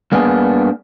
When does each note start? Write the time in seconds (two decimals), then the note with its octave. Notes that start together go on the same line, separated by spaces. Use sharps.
0.12 G2 A#3 B3 D4 G#4